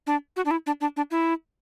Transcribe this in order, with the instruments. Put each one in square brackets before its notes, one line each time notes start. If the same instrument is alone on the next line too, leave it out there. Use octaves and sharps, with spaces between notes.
[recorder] D4
F#4
D4
E4
D4
D4
D4
E4